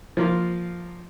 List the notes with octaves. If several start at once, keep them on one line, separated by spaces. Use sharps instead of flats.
F3 A#3 F4